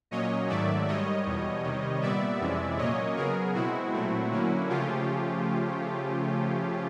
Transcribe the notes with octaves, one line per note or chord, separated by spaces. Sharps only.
A#2 F#3 A#3 C#4 C#5 D#5
G#2 D#3 F#3 A3 D5 E5
G#2 D#3 G3 C#5 D#5
E2 B2 G3
C3 D#3 G3
A#2 G3 B3 D5 E5
F2 C3 E3 G#3 C#4
A#2 F#3 A#3 C#4 C#5 D#5
C#3 F#3 B3 G#4 A#4
B2 G#3 C4 E4 F#4
A#2 F#3 A3 C4
D3 F#3 A#3 C#4
C#3 F3 A3 C#4 F4 G4